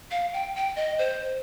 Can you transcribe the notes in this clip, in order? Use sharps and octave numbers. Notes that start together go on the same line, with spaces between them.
F5
G5
G5
D#5
C5